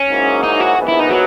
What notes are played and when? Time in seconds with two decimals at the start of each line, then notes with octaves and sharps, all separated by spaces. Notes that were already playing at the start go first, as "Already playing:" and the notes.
Already playing: C#4
0.09 G#2 F#3 A#3 E4 G#4
0.43 D#4
0.60 F#4
0.77 A#1 G#2 E3 B3
0.88 E4
1.00 D#4
1.11 F#3